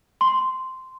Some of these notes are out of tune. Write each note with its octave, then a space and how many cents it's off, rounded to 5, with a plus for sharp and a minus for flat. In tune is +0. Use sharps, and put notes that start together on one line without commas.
C6 -10